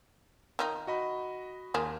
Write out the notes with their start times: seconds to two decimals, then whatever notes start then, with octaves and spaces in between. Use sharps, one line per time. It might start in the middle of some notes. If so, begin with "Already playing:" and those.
0.59 D#3 D#4 F4
0.87 F#4 D#5 B5
1.74 D#2 A#3 F4 G#4